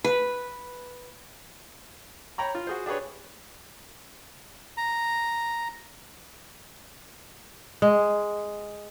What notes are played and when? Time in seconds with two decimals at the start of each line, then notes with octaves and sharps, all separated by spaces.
0.04 B4
2.38 C#5 G5 A#5 B5
2.55 F4
2.67 F#4 G#4 C5
2.86 D4 G4 G#4 B4 C#5
4.77 A#5
7.82 G#3